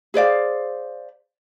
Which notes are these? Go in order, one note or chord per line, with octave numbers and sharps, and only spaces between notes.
G#4 C5 D5 F5